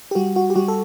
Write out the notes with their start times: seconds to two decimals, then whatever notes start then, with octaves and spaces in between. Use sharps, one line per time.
0.11 G4
0.15 G3 F#4
0.36 F#4
0.50 G4
0.55 G3 F#4
0.68 A4